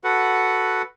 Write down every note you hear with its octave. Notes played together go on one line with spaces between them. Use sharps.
F#4 A4 B4 F#5